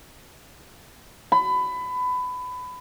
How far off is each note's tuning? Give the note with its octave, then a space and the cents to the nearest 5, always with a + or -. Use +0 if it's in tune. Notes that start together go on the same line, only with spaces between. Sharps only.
B5 +20